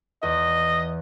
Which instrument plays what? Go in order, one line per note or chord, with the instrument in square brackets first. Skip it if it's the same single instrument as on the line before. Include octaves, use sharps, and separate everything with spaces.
[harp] E2 [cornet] D#5